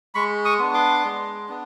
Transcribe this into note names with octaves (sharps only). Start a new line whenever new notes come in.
G#3 B5 C#6
C#6 D#6
B3 D4
C6 D6
G#3
B3 D4